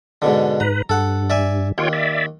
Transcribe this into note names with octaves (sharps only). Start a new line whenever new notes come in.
G#2 B2 D3
G#2 B4 A#5
G2 A4 F#5
D5 E5 G#5
D#2 F4 C#5 G5
D5 E5